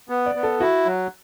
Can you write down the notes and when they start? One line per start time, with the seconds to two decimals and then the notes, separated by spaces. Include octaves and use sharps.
0.09 B3
0.26 D5
0.35 B3
0.43 A4
0.60 E4 F#4
0.85 F#3